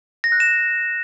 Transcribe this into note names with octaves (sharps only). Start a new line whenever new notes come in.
A#6
F#6
E7